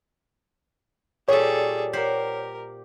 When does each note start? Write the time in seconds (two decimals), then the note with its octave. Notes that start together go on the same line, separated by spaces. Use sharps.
1.28 A#2 G3 G#4 A4 C#5
1.93 G4 A#4 C5 F#5